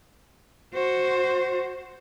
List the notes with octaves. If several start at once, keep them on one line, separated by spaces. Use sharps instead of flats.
F#4 C5